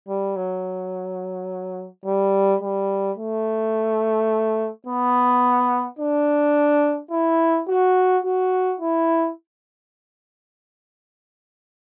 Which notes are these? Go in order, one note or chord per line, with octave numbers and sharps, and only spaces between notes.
G3
F#3
G3
G3
A3
B3
D4
E4
F#4
F#4
E4